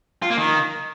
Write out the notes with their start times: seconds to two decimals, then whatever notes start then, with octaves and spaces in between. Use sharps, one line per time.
0.22 F4
0.30 A#3
0.38 D#3